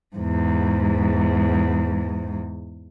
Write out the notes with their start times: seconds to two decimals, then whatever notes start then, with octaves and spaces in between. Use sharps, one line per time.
0.16 E2 G#2